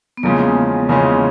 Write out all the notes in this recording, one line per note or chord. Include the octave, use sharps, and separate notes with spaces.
B3
E2 C#3 F3 G#3 A#3 C#4
E2 C#3 F3 G#3 C#4